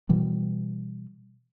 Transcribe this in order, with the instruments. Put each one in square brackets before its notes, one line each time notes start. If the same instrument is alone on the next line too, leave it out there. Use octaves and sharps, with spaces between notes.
[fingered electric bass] B2 E3 G3